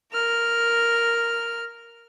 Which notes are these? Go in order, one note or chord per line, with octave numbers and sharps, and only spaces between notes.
A#4 F6